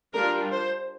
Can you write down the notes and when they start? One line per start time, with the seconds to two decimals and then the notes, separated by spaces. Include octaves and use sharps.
0.14 G3 D4 F4 A#4
0.52 C5